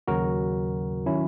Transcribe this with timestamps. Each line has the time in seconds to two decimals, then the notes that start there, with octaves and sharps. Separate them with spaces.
0.08 D#2 C#3 F#3 F#4 A#4
1.06 D#3 F#3 C#4 E4